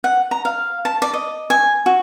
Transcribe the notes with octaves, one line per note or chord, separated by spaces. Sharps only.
F#5
A#5
F5
A5
D5
D#5
G#5
F#4